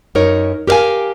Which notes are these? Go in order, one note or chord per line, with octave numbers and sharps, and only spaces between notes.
F#2 D#4 A#4 C#5
G4 A#4 C5 F5 G#5